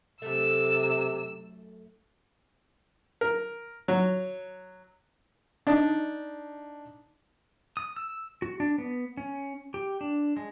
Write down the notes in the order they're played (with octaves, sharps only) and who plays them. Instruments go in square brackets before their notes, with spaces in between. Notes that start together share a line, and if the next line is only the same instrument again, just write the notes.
[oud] F#2 A3 [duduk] C3 [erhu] E6
[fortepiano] A#4
F#3
D4 D#4
[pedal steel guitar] D#6
E6
F#4
D4
B3
C#4
G4
D4
G#3